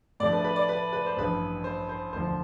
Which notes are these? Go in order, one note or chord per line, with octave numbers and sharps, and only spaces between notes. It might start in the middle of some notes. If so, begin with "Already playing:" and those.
A2 F3 A3 D4 D5
B4
B4
D5
B4
B4
C5
A1 G2 F3 B4
C5
C5
E1 D2 D3 F3 C5